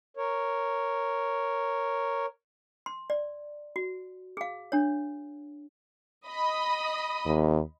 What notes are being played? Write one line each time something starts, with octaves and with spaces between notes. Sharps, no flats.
A#4 C#5
C6
D5
F#4
G#4 F5
D4 C#5
D#5 B5 D#6
D#2